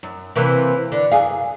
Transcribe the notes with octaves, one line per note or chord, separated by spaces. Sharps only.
F#2
C3 E3 A#3
D3
F#2 G#4 F5